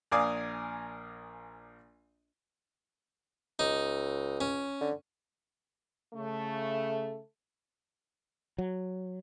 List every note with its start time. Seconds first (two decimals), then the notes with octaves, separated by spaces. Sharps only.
0.11 A#1 A#4 D5 F5 G#5 D#6
3.59 C#2 D#4
4.41 C#4
4.81 D3
6.14 C#3 A3
8.58 F#3